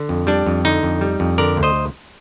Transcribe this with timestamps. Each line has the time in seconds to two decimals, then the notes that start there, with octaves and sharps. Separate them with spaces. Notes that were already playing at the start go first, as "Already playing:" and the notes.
Already playing: D3
0.09 F2
0.27 G3 D4
0.46 F2
0.65 D3 D#4
0.83 F2
1.01 G3
1.20 F2
1.38 D3 A#4 D5
1.57 D2
1.63 C5 D#5